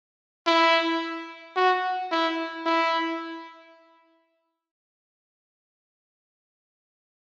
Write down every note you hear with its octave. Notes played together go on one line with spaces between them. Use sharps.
E4
F#4
E4
E4